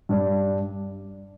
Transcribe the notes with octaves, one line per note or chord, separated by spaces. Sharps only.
G2 G3 D4